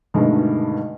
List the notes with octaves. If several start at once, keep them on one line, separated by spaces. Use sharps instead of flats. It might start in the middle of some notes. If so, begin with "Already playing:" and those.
G2 B2 D3 D#3 G#3 A3